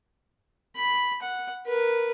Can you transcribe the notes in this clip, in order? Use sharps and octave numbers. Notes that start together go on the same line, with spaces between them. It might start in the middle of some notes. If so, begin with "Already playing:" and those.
B5
F#5
A#4 B4